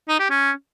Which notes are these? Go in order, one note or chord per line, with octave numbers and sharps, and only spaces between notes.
D#4
G4
C#4